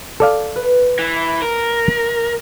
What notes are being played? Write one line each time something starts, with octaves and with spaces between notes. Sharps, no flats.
A4 D5 F5
B4
E3
A#4